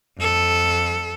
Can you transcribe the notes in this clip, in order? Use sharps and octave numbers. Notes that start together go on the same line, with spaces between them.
F2 A4